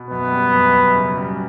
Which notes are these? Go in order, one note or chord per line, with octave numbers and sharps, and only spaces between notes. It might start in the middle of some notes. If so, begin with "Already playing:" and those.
Already playing: B2
F#2 B3
G3
F#2
F#2
C#3
G3